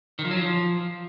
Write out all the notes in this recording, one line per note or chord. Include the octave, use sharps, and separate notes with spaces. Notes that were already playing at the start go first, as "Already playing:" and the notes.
D#3
F3
F#3
F3